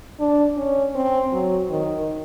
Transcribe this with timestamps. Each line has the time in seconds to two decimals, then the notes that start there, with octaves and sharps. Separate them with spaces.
0.20 D4
0.57 C#4
0.95 C4
1.32 F#3
1.70 D#3